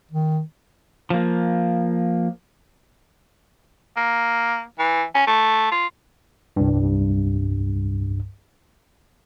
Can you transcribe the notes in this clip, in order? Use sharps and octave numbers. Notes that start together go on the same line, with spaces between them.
D#3
F3 A#3
A#3
E3
C#4
A3
F4
C2 G2